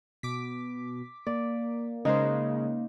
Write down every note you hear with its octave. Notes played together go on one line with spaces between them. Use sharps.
B2 D6 B6
A#3 D5
C#3 G#3 D#4 C5